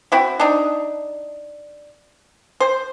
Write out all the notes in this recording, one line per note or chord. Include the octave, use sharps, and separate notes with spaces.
C4 E4 F#4
D4 D#4
C5